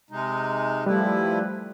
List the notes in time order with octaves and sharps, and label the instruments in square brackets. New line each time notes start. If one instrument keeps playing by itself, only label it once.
[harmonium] C3 G#3 D#4
[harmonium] F3 E4 B4 [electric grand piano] G3 A3